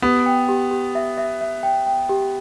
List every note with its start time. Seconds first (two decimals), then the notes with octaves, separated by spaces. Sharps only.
0.02 B3 G4
0.26 G5
0.49 G4
0.71 G4
0.95 E5
1.18 E5
1.41 E5
1.63 G5
1.86 G5
2.09 G4